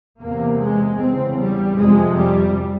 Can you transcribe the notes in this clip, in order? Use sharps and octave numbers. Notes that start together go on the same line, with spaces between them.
E2 C3 A#3
G#3
E2 C4
C#3
G3
F2 C3 G#3
G3